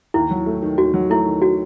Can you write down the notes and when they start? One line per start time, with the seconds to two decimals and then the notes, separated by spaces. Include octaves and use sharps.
0.14 D#2 E4
0.31 F#3
0.46 A3
0.62 D#3
0.78 D#2 F#4
0.94 F#3
1.10 A3 E4
1.26 D#3
1.42 F#4